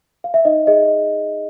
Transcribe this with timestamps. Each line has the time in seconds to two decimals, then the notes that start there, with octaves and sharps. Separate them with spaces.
0.24 F5
0.34 E5
0.45 D#4 D#5
0.67 G#4 D#5